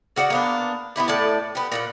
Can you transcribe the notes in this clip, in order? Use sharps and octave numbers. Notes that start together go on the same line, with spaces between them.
C#3 F#4 D5 F#5
A#3 B3 D4
B3 D#4 E4 G4
A2 D5 A5
B3 G4
A#2 G#4 F#5